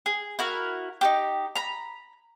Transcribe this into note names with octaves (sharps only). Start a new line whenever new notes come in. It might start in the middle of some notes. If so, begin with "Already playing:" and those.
G#4
E4 F#4 A#4
D#4 F#4 G4
A#5 B5